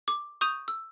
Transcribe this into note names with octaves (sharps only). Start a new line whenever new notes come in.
D6
C#6 D#6 G6 D#7 F7
E6